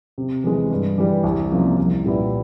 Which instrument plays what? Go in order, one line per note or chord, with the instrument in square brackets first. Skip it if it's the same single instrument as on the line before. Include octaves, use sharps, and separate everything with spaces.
[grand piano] C3
E3 G#3
G2
E3 G3
C2
C3 F3 A#3 C#4
C2
A#2 G3 B3 E4